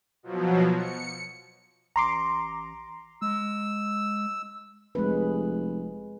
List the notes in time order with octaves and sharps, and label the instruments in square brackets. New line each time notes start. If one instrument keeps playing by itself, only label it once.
[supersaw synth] B2 F3 F#3
C#7
[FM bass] A1 [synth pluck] A#5 C6 D6
[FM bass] G#3 [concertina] E6
[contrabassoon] F1 [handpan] G#3 B4